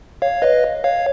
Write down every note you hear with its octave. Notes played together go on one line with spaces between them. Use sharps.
C#5 F5
B4 D#5
C#5 F5